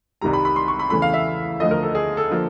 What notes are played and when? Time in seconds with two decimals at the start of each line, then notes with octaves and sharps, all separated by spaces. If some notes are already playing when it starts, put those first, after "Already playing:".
0.21 C2 C3 D#3 G3 A#5
0.33 B5
0.45 B5
0.56 C6
0.68 C#6
0.79 B5
0.90 E2 C#3 E3 A3 B5
1.02 F5
1.14 E5
1.60 D2 D3 F3 A3 D#5
1.71 A#4
1.83 A4
1.95 G#4
2.17 A4
2.30 D3 F3 A#3